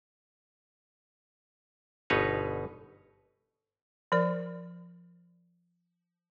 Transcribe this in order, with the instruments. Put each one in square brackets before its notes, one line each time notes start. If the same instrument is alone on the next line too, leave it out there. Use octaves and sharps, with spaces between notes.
[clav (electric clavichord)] G1 B2 D#4 B4 C#5
[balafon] F3 A#4 D5